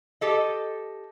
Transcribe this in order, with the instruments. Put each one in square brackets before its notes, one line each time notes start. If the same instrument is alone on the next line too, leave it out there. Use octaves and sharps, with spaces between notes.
[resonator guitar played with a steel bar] G4 A4 D#5